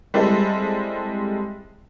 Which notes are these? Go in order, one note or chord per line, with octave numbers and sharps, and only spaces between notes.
G3 G#3 C4 E4 A4